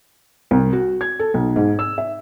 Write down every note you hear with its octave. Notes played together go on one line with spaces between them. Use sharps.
C2
F#4
G#6
A4
B1
G#2
E6
E5